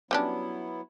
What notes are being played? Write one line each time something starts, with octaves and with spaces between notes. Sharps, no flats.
F#3 G3 B3 C#4 D4 E4